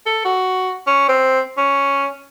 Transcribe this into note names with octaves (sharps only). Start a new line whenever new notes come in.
A4
F#4
C#4
C4
C#4